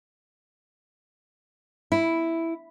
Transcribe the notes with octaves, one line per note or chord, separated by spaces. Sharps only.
E4